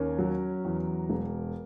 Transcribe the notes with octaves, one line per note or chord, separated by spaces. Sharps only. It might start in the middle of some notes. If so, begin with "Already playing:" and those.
Already playing: D#2 C#4 A#4
F#3
E2
E1